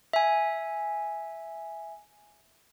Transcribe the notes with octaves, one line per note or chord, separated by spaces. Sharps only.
E5 G#5